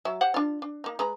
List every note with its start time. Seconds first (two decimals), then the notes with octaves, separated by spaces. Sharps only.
0.05 F#3 E5
0.21 G4 C5 F#5
0.34 D4 F4
0.62 D4
0.84 A#3 D#4
0.99 G#3 B4 A#5